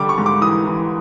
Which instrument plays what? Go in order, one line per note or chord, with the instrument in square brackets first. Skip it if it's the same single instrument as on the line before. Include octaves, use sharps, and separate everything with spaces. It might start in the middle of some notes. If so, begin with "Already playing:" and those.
Already playing: [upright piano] D3 G3 D6
C#6
G#2
D6
E3 D#6
E3